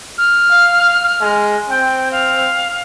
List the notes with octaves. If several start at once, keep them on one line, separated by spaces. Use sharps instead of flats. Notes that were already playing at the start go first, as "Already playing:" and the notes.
F6
F5
G#3
C4 G5
F5